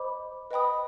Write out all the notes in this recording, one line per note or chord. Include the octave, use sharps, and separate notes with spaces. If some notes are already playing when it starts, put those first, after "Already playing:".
Already playing: C5 D#5 B5 D6
B4 D#5 G5 B5 D#6